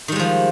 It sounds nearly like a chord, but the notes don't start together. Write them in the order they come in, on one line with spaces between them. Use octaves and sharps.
D#3 G3 G#3 F3